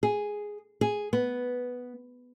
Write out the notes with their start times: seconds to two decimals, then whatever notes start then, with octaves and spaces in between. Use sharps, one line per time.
0.03 G#4
0.81 G#4
1.13 B3